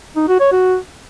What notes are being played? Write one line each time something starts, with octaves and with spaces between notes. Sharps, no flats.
D#4
F#4
C#5
F#4